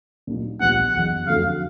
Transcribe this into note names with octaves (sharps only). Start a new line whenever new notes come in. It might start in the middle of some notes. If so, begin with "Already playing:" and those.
A#2 F#3 A#3 D#4 F#4
A#1 A#2 G3 B3 F#5
F#1 E2 B2 F#5
F2 D3 F#3 A3 C4 F5